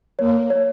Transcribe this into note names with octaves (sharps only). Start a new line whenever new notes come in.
A#3 C#5
C#5